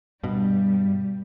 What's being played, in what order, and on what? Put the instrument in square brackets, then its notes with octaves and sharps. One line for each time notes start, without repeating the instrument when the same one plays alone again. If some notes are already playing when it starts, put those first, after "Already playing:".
[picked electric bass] G2 B2 [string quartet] G3